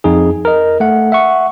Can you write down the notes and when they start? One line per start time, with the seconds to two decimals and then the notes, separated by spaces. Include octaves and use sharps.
0.04 F2 D#4 G#4
0.45 A#4 D#5
0.80 A3 F#5
1.12 E5 F#5 C#6